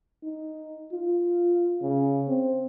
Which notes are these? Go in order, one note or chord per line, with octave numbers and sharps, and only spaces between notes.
D#4
F4
C#3
C4